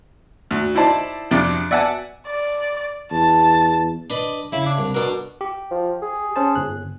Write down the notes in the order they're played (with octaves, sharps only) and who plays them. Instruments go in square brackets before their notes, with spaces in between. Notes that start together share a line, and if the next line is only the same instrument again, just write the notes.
[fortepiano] D2
D#4 E4 C5 D5 A5
F2 C3 D4
D5 E5 F#5 G#5 A5
[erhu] D5
[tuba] E2 [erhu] A5
[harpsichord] D4 B4 D#5
[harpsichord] C#3 [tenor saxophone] E4
[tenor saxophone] D4
[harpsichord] C2
[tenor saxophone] B2 [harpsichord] D4 A#4
[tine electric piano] G4
[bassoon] F3
G#4
[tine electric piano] C#4 C5 A5
G1 F#6